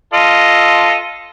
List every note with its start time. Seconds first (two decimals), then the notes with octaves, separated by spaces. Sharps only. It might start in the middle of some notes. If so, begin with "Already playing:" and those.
0.13 F4 A4 D#5